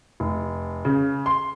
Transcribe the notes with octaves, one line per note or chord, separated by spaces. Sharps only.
F1
C#3
C6